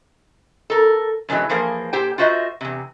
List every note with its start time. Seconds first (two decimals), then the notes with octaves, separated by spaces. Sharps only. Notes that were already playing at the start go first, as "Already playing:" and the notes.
0.70 A4 A#4
1.29 F#2 B2 E3 F#3 G#3
1.49 E3 F3 A#3 G#4 A#4 C5
1.93 A#2 G4 C5 G5
2.18 F4 F#4 C5 D#5 E5
2.61 E2 C3